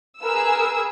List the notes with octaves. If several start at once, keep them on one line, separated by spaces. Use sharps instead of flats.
G#4 A#4 B4 E6